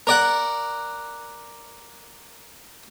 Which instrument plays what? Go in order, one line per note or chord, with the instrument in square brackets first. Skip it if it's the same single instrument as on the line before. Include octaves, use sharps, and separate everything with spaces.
[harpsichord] A#4 D5 F#5